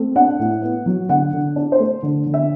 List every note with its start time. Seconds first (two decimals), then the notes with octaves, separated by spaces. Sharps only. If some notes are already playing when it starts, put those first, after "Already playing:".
Already playing: A3 C4
0.16 D4 F#5
0.39 A2
0.62 B3
0.86 F#3
1.09 D3 F#5
1.33 D3
1.56 D4
1.72 C5
1.80 A3
2.03 D3
2.26 D3
2.34 E5